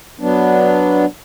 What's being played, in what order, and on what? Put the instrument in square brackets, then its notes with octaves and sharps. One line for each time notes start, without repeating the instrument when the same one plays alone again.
[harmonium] F#3 B3 D4